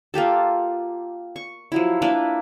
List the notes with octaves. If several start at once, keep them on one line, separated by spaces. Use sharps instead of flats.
A#3 F4 G4 A4
C#6
F3 F#3 E4
A#3 D4 E4 B4